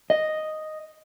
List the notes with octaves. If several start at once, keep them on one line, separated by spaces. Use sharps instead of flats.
D#5